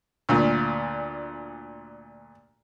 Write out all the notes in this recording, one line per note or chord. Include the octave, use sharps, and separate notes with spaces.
D2 A#2